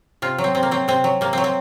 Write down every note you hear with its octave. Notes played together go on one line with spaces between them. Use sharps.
C3 F4
F#3
C4
C3 C4
A#3
F#3 C4
C3 C4
F#3
C3 A#3
F#3 C4
C4